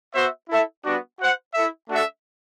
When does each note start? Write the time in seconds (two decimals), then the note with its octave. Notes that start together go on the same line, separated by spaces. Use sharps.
0.14 B3 F#4 C5 E5
0.49 E4 A4 E5
0.84 G3 B3 D4 F#4
1.19 F#4 C5 F#5
1.54 E4 A4 E5
1.89 A3 D4 F#4 A4 E5